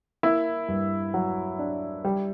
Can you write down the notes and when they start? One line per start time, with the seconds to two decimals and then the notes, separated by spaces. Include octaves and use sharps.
0.23 A#3 E4
0.68 G2
1.14 F#3
1.59 D4
2.05 G3